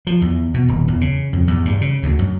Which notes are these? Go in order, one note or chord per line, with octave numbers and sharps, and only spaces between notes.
F3
E2
B2
D#1
E2
C#3
F2
E2
G2
C#3
D2
F#2